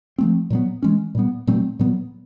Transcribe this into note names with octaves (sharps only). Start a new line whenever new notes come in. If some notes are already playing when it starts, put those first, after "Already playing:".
F3 A3 C4
A#2 F#3 B3
E3 G#3 C#4
A#2 G3 B3
A#2 F#3 A3 C4
A#2 F#3 B3